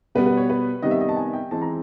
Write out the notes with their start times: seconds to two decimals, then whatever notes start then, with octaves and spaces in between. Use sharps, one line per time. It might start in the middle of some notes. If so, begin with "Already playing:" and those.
0.15 B2 G3 B3 B4
0.26 B4
0.37 C#5
0.50 B4
0.82 C3 D#3 G3 B3 D#5
0.91 E5
1.01 D#5
1.09 A5
1.17 G#5
1.33 G5
1.51 E3 G#3 C4 A5
1.62 A#5